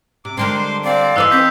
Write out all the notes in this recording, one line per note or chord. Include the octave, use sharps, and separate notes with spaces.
C3 D6
D3 G3 G#3 A#4 C5 C6 D6
C4 D5 F5
E3 D#4 B4 D5 C6 D6 E6 F#6
C4 G6 B6